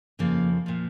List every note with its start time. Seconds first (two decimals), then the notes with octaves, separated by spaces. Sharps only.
0.19 F2 C#3 F3 A#3
0.66 A#2 F3